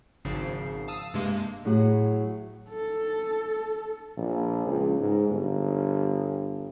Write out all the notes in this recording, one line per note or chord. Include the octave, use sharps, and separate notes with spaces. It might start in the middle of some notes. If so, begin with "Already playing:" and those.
G#1 G#2 C#3 F3 C7
F5 A5 D#6 E6 D#7
G2 C3 G#3 A#3
A2 F#3 G#4
A4
A#1
C#2
G#2
G1